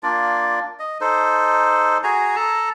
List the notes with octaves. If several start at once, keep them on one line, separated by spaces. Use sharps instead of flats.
A#3 D4 F4 D5
D#5
D#4 A4 C5
F#4 G#4 G#5 A#5
A4 A5 A#5